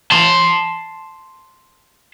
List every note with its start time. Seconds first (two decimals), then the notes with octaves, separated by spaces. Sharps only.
0.11 A5 C6